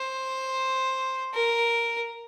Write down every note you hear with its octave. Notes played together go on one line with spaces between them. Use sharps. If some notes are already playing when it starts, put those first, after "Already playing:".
Already playing: C5
A#4